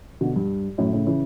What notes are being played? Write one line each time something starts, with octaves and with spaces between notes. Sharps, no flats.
B2 D3
G2
F#2 A2
A2 C#3
C#3 E3